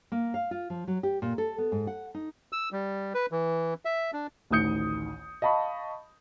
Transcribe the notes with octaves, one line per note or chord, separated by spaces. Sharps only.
A#3
F5
F4
F3
F#3
G4
A#2
A4
B3
G#2
F#5
D#4
E6
G3
B4
E3
E5
D4
A1 D2 D#3 D#6 G6 C#7
D#5 F5 A5 B5 C#6